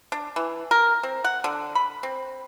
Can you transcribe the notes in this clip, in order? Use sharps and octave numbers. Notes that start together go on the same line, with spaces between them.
D4
E3
A#4
C4
F#5
D3
B5
C4